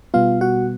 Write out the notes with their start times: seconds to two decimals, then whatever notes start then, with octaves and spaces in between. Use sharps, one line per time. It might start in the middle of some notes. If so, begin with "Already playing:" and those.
0.14 B2 G3 B3 F4 F5
0.41 F#4 F#5